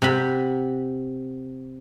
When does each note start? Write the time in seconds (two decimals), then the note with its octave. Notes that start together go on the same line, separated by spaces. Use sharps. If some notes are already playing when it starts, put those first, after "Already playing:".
0.02 C3 F#5 B5